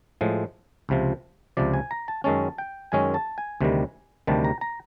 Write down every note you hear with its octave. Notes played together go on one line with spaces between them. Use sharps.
A2 F3 G#3
C#2 C3 F3
C#2 C3 F3 D5
G#5
A#5
A5
F#2 D#3 G#3 C#4 A5
G5
F#2 D#3 G#3 C#4 G#5
A5
G#5
D2 C3 D#3 G3
D2 C3 D#3 G3 A5
A#5
A#5